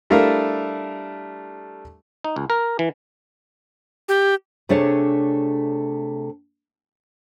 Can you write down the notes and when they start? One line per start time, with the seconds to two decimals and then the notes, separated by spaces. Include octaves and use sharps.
0.10 G3 A3 D4 E4 A#4 F5
2.24 D#4
2.36 C#2
2.50 A#4
2.79 E3
4.09 G4
4.69 C3 A3 D4 G#4 C#5